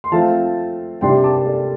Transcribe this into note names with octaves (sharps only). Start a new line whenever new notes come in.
C6
F3 A3 C4 F5 A5
C3 G3 D4 G5 C6
A5 D6
A4 D5